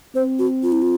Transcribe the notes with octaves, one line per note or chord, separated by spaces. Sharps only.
C4 C5
F#4
F4
E4
F4